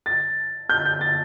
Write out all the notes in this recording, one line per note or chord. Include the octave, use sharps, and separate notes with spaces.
A6
G6
G6
A6